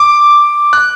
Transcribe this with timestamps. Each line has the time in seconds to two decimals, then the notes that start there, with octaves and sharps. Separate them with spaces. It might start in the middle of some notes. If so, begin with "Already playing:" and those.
Already playing: D6
0.73 F#6